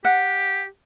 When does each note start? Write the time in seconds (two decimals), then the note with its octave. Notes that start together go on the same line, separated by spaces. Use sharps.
0.05 G4 F#5